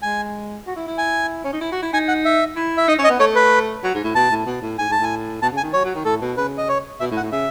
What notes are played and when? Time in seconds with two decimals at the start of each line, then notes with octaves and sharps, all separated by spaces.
0.02 G#3 G#5
0.66 F#4
0.76 E4
0.87 E4
0.98 G#5
1.44 C#4
1.53 D#4
1.61 E4
1.72 F#4
1.82 E4
1.93 D#4 G#5
2.08 F#5
2.25 E5
2.56 E4
2.77 E5
2.88 D#4 D#5
2.99 C#4
3.04 D#5
3.09 B3
3.20 A3 C#5
3.35 B4
3.83 F#3
3.94 G#2
4.04 A2
4.15 B2 A5
4.31 A2
4.46 B2
4.62 A2
4.78 G#2 G#5
4.89 G#2 A5
5.00 A2 G#5
5.42 B2 A5
5.52 C#3
5.57 G#5
5.63 D#3
5.73 F#3 C#5
5.84 F#3
5.95 D#3
6.05 A2 A4
6.21 B2
6.37 C#3 B4
6.58 D#5
6.69 C#5
7.00 B2 E5
7.11 A2
7.17 F#5
7.22 A2
7.32 C#3 E5